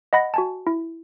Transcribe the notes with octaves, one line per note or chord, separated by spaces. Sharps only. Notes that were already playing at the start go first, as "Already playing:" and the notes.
D#5 F#5 B5 A#6
F#4 G#5 A5
E4